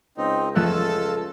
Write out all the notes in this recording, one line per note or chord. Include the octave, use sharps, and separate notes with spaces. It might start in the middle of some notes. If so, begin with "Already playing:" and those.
C#2 C4 D#4
F2 A3 F4 A4 E6 F#6